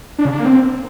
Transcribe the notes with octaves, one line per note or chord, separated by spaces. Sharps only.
D4
C#3
D4
A#3
C4